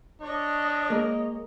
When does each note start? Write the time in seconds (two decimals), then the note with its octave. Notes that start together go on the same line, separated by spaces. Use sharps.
0.22 D4 C#5 D#5
0.90 G#3 A#3 A#4